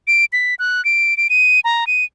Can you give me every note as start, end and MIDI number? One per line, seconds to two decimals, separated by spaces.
0.08 0.25 98
0.33 0.55 95
0.59 0.84 90
0.85 1.16 98
1.17 1.28 98
1.30 1.60 99
1.64 1.87 82
1.87 2.04 99